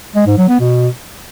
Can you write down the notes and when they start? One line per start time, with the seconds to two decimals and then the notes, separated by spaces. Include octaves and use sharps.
0.16 G#3
0.27 G#2
0.38 F#3
0.49 B3
0.60 B2